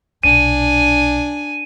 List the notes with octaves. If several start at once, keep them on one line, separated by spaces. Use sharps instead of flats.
B1 A#2 D4 G#5 D#7